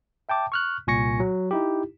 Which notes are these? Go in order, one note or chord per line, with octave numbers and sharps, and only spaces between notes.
E5 G5 A5 D6
C#6 F6 F#6
C2 A#2 G#5 C#6 A#6 C#7
F#3
D#4 E4 G4